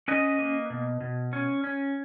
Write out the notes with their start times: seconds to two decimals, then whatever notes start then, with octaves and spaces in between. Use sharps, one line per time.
0.08 C#4 B4 D#5
0.39 A#3
0.70 B2
1.00 B2
1.33 C#4
1.64 C#4